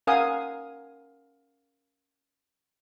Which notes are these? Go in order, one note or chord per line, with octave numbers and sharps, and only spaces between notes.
C#4 A#4 F5 F#5 G#5 D#6